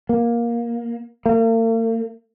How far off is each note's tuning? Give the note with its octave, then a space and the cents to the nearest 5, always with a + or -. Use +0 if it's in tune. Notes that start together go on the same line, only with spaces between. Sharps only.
A#3 +15
A#3 -45